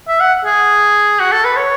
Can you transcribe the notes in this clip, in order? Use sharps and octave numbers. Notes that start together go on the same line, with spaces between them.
E5
F#5
G#4
F#4
A4
B4
C#5